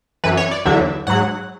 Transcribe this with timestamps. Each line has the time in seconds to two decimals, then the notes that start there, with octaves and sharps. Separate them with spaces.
0.24 F#2 E3 B4
0.37 C#5
0.51 D5
0.65 E2 D3 F#3 E5
1.07 G#2 F#3 F#5